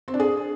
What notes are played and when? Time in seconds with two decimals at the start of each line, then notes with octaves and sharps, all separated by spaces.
0.08 C4
0.14 D4
0.20 G#4